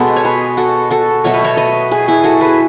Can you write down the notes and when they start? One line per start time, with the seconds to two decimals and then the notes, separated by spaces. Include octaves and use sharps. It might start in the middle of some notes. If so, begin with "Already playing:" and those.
Already playing: B2 G#3 B3 A4
0.16 C#5
0.25 G#4 B4
0.57 F#4 A4
0.91 F#4 A4
1.24 B2 F#3 A3 C#5
1.34 B4
1.44 A4 C#5
1.57 B4 D#5
1.91 G#4 B4
2.08 E4 G#4
2.24 F#4 A4
2.41 G#4 B4